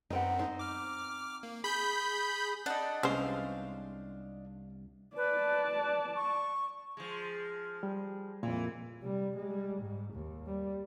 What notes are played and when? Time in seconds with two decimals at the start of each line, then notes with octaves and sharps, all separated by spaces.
0.10 F#2 B3 C4 D#4
0.39 D#4 C5
0.59 D6 F6
1.43 A#3
1.64 G#4 B5 G6
2.66 D4 D#4 F#5 A5
3.03 C2 G#3 B3 C#4 C5 F5
5.17 B4 D5 A5
6.16 C#6
6.97 F3 G#3
7.83 G3
8.43 F2 A#2 E3
9.01 C3 G3
9.37 G3 G#3
9.82 G#2
10.14 D#2
10.46 G3